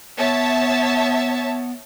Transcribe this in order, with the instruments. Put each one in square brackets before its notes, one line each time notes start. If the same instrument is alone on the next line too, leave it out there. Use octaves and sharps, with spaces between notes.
[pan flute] B3 [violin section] C#5 E5 A5